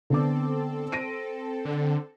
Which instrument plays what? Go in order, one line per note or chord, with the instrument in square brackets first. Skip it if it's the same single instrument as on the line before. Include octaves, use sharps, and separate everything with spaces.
[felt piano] D3 B3 D6 [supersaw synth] C4 A4
[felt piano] A#6 D7 D#7
[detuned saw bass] D3